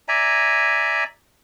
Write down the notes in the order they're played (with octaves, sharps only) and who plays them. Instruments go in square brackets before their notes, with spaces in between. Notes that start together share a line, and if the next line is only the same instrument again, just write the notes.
[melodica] D5 E5 G#5 A#5